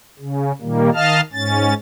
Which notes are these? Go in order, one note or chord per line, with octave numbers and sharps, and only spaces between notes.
C#3
A#2 D#3 G3 A#3
D#3 D#5 F5 A5 F6
G#2 C#4 A6